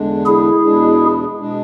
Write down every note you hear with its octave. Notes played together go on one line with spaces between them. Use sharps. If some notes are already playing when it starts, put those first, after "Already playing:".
Already playing: E2 D3 G#3 D4
E4 G#4
E2 B2 G#3 D4
B2 G#3 D4